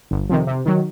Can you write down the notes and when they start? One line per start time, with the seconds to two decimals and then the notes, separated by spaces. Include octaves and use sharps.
0.11 G1
0.29 F2 C3 D#3
0.47 C3
0.66 D#3 F#3